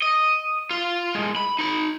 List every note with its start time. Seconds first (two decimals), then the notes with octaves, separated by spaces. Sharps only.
0.02 D#5
0.70 F4
1.15 A2 G#3
1.36 B5
1.59 D#4 B5